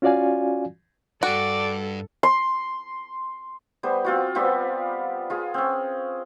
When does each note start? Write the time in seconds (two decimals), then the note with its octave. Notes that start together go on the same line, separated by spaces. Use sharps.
0.02 C#4 F4 F#4 D5 F5 G#5
1.23 G2 F#4 A4 D5 G5
2.23 C6
3.83 G3 B3 C5
4.05 C4 F4 F#4
4.35 G3 B3 C4 F4
5.30 F4 G#4
5.54 C4 C#4